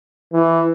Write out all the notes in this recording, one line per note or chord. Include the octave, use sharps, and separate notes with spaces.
E3